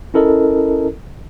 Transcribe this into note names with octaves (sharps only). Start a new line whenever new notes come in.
C#4 E4 A4 A#4 D#5